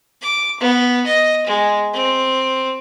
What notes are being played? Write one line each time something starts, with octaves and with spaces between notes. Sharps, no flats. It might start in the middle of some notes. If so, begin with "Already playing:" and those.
D6
B3
D#5
G#3
C4